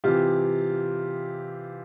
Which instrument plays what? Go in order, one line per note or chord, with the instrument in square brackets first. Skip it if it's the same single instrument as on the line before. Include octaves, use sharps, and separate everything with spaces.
[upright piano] C3 E3 F4 G4